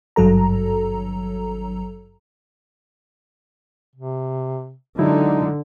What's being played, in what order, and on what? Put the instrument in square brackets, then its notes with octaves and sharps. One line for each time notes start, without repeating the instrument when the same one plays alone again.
[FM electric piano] G#1 G2 F#3 A4 A#5
[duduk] C3
[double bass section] D3 [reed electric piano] F#3 G#3 E4 [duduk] D#4